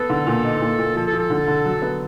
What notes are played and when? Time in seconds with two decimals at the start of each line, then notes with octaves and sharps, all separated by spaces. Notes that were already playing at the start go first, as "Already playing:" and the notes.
Already playing: B3 A4
0.10 D3
0.27 A#2
0.44 D#4
0.61 A#2
0.79 A#2
0.95 F3 A4
1.07 A4
1.13 F3
1.19 A4
1.30 D3
1.48 D3
1.65 F#3
1.82 B3